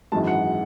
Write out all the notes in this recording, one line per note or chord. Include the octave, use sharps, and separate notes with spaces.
G#1 F#2 E3 G#3 A5
F#5